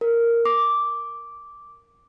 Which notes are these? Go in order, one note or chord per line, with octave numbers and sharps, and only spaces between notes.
A#4
D6